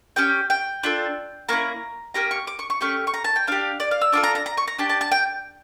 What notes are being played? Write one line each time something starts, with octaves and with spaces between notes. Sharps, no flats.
C#4 G4 G5
G5
D4 F4 A4
A#3 C#4 E4 A#5
A#3 C#4 G4 A#5
C#6
D6
C#6
C#6
A3 C#4 G4 C#6
C#6
A#5
A5
G5
D4 G4 F5
D5
F5
E6
D4 F4 A4 D6
A#5
A#5
A#5
C#6
A#5
D4 G4 A5
A5
A5
G5